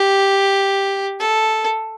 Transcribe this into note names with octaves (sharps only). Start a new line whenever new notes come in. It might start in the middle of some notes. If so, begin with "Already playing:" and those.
Already playing: G4
A4